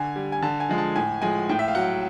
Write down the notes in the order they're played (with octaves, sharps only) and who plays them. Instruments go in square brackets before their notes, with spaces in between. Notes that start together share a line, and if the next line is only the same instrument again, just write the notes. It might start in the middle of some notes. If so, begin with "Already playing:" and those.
Already playing: [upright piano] D3 G#5
G3
G#5
D3 A5
G#5
F3 G#3
A5
A2 G#5
F3 G#3 G#5
A2 G5
E5
F5
F#3 F#5